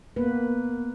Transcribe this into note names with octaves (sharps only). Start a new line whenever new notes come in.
A#3 B3 B4